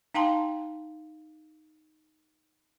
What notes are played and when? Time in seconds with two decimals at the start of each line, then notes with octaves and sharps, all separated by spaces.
0.15 D#4 F5 G5 A5 C6